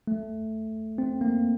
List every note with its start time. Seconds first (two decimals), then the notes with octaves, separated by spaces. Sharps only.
0.07 A3
0.98 C4
1.21 A#3